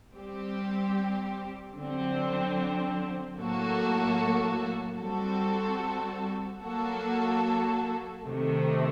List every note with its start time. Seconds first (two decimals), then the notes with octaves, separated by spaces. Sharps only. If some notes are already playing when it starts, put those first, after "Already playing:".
0.13 G3 C4 G4
1.75 D3 F#3 C4
3.37 A2 F#3 A#3 F#4 A4
4.99 G3 C4 F#4 A4
6.61 F#3 A#3 F#4 A4
8.24 C3 D#3 A3